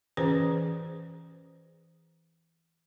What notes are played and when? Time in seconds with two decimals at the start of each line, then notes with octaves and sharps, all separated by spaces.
0.17 E3 C#4 G#4 B4 C5